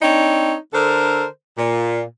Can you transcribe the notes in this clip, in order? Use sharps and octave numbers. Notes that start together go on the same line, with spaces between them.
C4 D4 D#4 C#5
D3 A4 A#4 C5
A#2